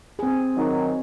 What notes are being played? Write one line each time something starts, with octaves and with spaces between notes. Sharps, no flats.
C4 G#4
D#3 F#3 D#4